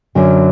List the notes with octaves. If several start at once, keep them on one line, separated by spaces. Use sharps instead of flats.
F#2 D3 F#3